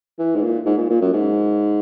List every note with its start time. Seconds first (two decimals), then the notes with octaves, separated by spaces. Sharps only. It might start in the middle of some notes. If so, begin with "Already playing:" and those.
0.19 E3
0.35 G#2
0.42 A#2
0.66 G#2
0.78 A#2
0.90 A#2
1.01 F#2
1.13 G#2